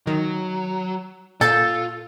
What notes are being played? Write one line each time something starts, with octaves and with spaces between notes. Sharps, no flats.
D#3 F#3
A#2 F4 A4 G6 A6